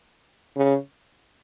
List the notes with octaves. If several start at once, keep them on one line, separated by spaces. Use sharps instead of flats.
C#3